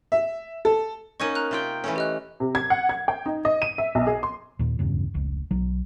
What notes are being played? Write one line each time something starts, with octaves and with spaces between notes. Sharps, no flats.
E5
A4
A#3 C#4 D#4 C#6 G#6 D#7
A#5 F6 F#6
C3 F4 G5
E3 A3 C#4
G4 D#5 F#6
C3
G#6
F#5
G#6
G5
D#4
D#5
D#7
E5
B1
G#4
C6
D#2 A#2
D1 E2 G2 C#3
F1 C#2
B1 F#3